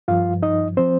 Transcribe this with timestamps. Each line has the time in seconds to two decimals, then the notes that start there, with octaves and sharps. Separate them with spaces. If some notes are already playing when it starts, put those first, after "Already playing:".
0.08 G2 F3 F4 F5
0.42 D#4 D#5
0.77 F3 C4 C5